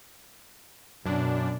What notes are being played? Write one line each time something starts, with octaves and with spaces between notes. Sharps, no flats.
F#2 B2 D4